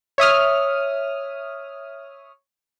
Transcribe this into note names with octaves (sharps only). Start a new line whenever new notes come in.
C#5 E5 D#6 F6